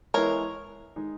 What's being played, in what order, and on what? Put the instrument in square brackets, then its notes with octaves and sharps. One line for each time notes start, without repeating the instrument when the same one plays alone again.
[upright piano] E3 G#3 B3 E4 [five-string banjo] A#4 C#5
[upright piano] D#3 G#3 D#4